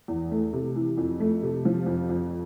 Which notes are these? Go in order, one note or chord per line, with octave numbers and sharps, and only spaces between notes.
E2
A3
C3
E3
F2
A3
C3
F3
F2
F2